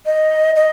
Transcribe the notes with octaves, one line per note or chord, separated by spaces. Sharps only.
D#5
D#5